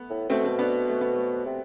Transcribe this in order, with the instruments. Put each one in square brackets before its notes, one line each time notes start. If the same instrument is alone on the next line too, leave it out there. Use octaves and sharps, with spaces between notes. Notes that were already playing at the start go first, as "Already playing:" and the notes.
Already playing: [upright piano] A3 B3
[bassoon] A2
[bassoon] B2 [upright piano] A3 C4
[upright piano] A3 C4
B3 D4
A3
B3
A3
[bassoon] C3